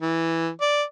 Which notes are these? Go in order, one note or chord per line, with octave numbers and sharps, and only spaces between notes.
E3
D5